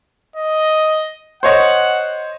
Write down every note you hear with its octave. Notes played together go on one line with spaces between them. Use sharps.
D#5
C5 C#5 D#5 F#5